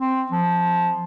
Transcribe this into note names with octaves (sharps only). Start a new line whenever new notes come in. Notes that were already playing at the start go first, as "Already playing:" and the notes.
C4
F3